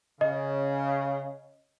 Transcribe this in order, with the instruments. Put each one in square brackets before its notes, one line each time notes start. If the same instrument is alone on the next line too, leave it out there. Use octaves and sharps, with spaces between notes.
[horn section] C#3 [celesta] D#5